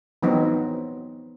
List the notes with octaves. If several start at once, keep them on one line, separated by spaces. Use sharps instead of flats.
E3 F#3 B3 C4 D#4